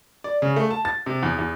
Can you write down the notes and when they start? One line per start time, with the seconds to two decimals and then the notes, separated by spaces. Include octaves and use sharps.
0.24 D5
0.42 C#3
0.56 A3
0.70 A5
0.85 A6
1.06 C3
1.23 E2
1.38 E2